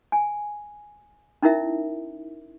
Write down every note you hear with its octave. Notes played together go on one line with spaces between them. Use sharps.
G#5
C#4 D#4 E4 A#4 E5